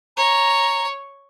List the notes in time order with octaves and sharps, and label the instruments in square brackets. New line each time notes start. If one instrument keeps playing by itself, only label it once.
[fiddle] C#5 [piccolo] A#5